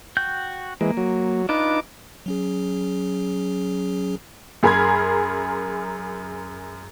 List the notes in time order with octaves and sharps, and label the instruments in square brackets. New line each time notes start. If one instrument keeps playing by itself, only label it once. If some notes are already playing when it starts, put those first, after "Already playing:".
[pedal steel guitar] F#4 G5 G6
[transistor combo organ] E3 G#3 [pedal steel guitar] A#3
[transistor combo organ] F#3
[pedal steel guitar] D4 F4 B4 [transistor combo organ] D#4 D6
[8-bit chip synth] F#3 C#4 G#4
[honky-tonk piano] F#2 G#4 A#4 B5 C6 G#6